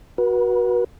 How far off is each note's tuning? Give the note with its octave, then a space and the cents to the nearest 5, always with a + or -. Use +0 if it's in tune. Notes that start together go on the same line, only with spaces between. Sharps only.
F#4 +0 B4 -40